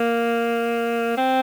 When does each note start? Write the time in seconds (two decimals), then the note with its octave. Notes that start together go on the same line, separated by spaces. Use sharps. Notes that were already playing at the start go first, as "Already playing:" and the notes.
Already playing: A#3
1.17 C4